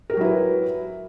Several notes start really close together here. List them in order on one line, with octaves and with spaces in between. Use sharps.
A#4 G4 F#3 E4 B4